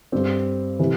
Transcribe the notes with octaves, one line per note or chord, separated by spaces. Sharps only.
G2 G3 C4 G4
C3 E3